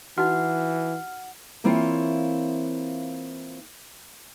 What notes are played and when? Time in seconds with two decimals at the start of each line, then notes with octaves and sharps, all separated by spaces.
0.18 E3 D#4 F#4 F#5 F6
1.64 E3 A#3 C4 E4 F4 C#5